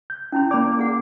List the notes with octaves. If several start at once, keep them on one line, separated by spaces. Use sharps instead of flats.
G6
C#4 E4 B5
A#3 D5 B5 D6
G#4 F#5